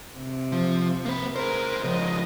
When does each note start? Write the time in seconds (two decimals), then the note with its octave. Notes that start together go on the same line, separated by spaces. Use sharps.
0.17 C3
0.52 F3
1.05 A#3 B4
1.36 G#4 A#4 C5
1.84 C#3 F3 D#5